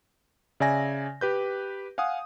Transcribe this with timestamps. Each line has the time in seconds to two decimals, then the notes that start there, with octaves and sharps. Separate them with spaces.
0.60 C#3 D5 E5 G#5 A#6
1.21 G4 B4 G6
1.98 F5 F#5 G#5 D#6